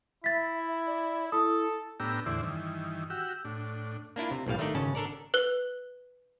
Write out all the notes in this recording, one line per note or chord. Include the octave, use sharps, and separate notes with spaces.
E4 E5 A6 B6
D5
E4 A4 D#6
A2 B3 D4 G4 A#5 E6
E2 A2 D3 E4 C5 D5
G2 D#3 E3
F#4 G4 E6
A2 D4
A#3 D4 E4 F4
C3
B1 A2 G3 F5
D#3 A3 D4 D#4 D5
G#1 C#3 C#4 A5
D4 A4 A#4 D5
B4 F#6 G7